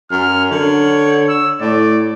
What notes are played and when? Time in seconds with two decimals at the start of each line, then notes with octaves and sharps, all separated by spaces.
0.11 F#2 F6
0.51 D3 C#5
1.29 E6
1.61 A2 D5